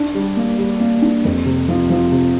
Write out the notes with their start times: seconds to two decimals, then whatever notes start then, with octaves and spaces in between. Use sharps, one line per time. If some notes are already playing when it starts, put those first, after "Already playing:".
Already playing: D4
0.15 G3
0.37 A#3
0.58 G3
0.80 A#3
1.02 D4
1.25 F2
1.45 C3
1.68 F3
1.90 F3
2.11 C3